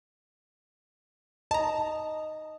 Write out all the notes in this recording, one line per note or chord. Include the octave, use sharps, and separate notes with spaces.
D#5 A5 A#5